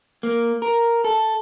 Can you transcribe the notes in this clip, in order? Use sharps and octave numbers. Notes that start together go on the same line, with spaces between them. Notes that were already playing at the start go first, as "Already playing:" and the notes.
A#3
A#4
A4